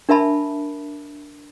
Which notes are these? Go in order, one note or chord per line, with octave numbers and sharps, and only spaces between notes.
D4 A#4 E5 A5 B5